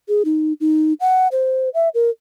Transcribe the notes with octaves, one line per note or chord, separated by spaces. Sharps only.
G#4
D#4
D#4
F#5
C5
E5
A#4